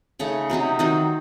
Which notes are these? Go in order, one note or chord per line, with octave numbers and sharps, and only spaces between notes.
C#3 A3 D#4 C#5
C3 F#3 C4 D#4
D#3 F#3 C4 D#4